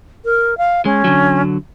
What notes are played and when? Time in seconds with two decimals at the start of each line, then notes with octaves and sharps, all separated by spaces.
0.25 A#4
0.58 F5
0.85 G#3 C#4
1.04 D3 F#3